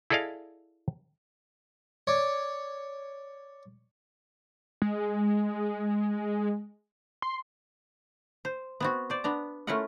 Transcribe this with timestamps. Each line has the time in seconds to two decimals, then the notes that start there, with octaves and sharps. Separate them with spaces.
0.10 E4 G#4 A4 D5 D#5 F5
2.07 C#5 D5
4.82 G#3
7.22 C6
8.45 C5
8.80 B3 C4 F#4
9.10 C5 D5
9.24 B3 D4 A#5
9.67 A3 C#4 E4 F4 A#4 F#5